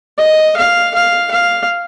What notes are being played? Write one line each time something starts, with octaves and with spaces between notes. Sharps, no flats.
D#5
F5
F5
F5